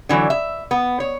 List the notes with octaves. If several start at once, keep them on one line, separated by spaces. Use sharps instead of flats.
D3 E3 F#3
E5
B3
C#5